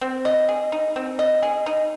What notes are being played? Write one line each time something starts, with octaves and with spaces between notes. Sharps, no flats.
C4
D#5
G#4
D#4
C4
D#5
G#4
D#4